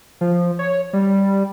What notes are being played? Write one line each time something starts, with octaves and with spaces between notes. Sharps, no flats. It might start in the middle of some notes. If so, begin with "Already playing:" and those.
F3
C#5
G3